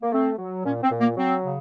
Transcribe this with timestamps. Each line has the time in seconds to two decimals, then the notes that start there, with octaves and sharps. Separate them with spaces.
0.02 A#3
0.12 A3 C4
0.38 F#3
0.64 A#2 C#4
0.82 C4
0.91 A#2
1.00 A#3
1.17 F#3 C4
1.43 C#3